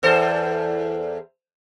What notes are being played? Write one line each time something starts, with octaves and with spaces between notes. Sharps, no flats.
E2 A4 C5